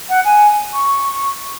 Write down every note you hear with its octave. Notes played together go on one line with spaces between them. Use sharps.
F#5
G#5
C#6